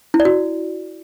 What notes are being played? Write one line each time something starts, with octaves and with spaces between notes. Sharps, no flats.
E4
D5
F#4